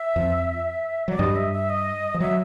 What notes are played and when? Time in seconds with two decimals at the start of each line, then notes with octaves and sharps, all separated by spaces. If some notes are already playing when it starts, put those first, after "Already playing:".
Already playing: E5
0.16 F2 F3
1.08 F#3 D5
1.19 G2 G3 D#5
1.36 E5
1.53 E5
1.69 D#5
2.14 F3
2.20 F#3 E5